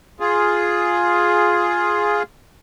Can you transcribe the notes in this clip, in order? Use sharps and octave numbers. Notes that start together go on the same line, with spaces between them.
F4 G#4